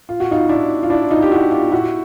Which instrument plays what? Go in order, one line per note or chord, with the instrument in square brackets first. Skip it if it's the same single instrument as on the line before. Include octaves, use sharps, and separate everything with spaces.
[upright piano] F4
F#4
D#4 F4
D4 E4
F4
D4 E4
D#4 F4
G4
E4 F#4
F4 G4
E4 F#4